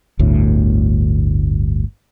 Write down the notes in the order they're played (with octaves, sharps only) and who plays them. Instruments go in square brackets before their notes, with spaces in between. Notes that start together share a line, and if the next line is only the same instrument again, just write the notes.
[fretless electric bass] G1 D2 A2